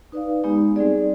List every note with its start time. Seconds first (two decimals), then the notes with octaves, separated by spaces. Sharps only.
0.12 D#4 B4 D5 F5
0.44 G#3 B3 D#4 G4
0.76 G3 C4 D#4 G#4 D5